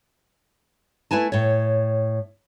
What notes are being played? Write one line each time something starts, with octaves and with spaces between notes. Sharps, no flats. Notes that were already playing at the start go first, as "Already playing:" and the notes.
A3 E4 B4 G#5 A5
A2 C#5